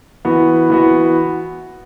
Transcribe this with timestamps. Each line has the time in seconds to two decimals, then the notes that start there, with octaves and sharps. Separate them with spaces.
0.25 E3 B3 F#4
0.70 E3 B3 F#4